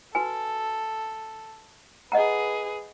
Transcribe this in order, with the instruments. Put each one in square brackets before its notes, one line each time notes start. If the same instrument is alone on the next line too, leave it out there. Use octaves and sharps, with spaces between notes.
[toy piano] F#4 B4 G#5 [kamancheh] A4
[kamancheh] G#4 B4 [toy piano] D#5 F#5 A#5